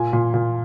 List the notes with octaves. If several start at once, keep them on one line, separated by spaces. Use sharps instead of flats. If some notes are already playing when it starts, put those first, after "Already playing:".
Already playing: A#2 G#5
A#2
A#2